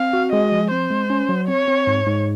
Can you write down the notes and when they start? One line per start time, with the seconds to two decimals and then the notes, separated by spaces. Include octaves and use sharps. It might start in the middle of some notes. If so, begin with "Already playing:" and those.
Already playing: C4 F5
0.13 F#4
0.33 G#3 D#5
0.52 F3
0.71 C4 C5
0.91 G#3
1.10 C#4
1.29 F#3
1.48 C4 C#5
1.68 C4
1.87 G#2
2.06 G#2